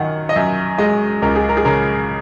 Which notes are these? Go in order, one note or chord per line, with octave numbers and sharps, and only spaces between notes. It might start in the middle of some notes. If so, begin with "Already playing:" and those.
Already playing: F#2 D#3 F#5
D#5
F#2 E5
G#3 D#5
C#2 A#4
G#4
A#4
G#4
C#3 A#4